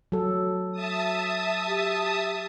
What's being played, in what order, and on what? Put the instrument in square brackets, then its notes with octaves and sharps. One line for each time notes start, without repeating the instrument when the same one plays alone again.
[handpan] F#3 A4
[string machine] E5 A5 D#6
[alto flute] G4